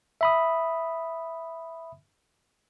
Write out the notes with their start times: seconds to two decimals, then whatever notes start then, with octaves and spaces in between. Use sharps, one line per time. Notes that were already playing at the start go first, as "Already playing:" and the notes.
0.21 E5 B5 D#6